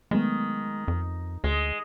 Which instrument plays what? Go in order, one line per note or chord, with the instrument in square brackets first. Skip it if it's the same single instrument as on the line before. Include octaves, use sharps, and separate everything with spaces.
[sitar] D#3 [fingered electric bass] F#3 A3 B3 [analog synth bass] G#3
[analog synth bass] F2
[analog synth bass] D2 [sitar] G#3